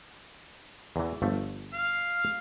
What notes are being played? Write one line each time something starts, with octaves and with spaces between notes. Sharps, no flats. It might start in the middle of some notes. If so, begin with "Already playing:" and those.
E2 E3
G1 F3 A3
F5